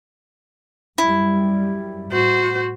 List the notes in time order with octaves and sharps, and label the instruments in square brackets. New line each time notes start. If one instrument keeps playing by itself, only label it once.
[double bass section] F#2 G3 [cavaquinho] E4
[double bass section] A2 [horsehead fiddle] F#4 C5